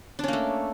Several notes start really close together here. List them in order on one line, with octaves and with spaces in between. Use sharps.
D4 C#4 A#3 A3